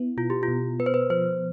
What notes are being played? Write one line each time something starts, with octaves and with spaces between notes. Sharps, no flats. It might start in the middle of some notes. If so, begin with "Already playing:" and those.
Already playing: B3 E4
B2 F4
G4
F4
B2
B3 B4
C5
B4
F3 C5